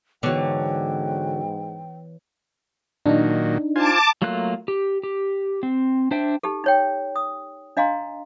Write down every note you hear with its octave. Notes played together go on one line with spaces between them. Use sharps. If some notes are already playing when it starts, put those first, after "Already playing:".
G#2 D3 E3 F#3 B3 C#5 G5
A#2 D#3 F#3 D4 D#4
F4 C5 G#5 A5 D6
F#3 A3 A#3 F4 F#6
G4
G4
C4
D4 C5 E5 G5
D#4 G4 A4
D#4 C#5 G5
D#6
D4 D#5 F5 G#5 A#5 C6